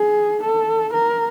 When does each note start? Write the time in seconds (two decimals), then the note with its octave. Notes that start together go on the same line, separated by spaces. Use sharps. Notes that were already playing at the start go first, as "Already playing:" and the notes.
Already playing: G#4
0.44 A4
0.93 A#4